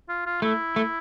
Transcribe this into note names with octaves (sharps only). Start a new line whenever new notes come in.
F4
F4
A3 E4
A3